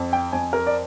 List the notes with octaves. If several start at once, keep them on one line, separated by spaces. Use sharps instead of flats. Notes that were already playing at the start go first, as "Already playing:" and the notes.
Already playing: F2
G5
F2 G#5
A#4
D5